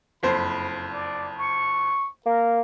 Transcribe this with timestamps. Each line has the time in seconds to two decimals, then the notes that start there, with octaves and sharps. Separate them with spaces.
0.23 F#1 F2 C5 B5
0.93 D5
1.37 C#6
2.26 A#3 A#4